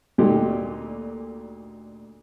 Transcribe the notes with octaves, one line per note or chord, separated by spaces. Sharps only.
D2 A#2 A3 D#4 G4